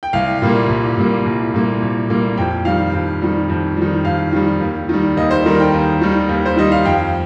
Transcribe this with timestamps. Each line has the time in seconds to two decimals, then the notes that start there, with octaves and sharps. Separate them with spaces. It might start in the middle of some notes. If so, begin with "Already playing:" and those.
0.03 G5
0.13 C2 F5
0.42 A#2 G3 A#3
0.69 C2
0.97 A#2 G3 A#3
1.25 C2
1.54 A#2 G3 A#3
1.82 C2
2.09 A#2 G3 A#3
2.37 F2 G5
2.65 D#3 G3 F5
2.94 F2
3.22 D#3 G3
3.50 F2
3.77 D#3 G3
4.05 F2 F5
4.33 D#3 G3
4.61 D#2
4.89 D#3 G3
5.17 D#2 D#5
5.31 C5
5.46 D#3 G3 A#4
5.60 G5
5.74 D#2
6.02 D#3 G3
6.29 D#2
6.46 C5
6.57 D#3 G3 D#5
6.72 F5
6.85 F2 G5